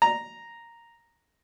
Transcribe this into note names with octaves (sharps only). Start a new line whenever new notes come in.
A#5